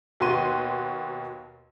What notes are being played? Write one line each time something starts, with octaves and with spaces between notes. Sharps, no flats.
D#2 B2 F#4 C6 D#7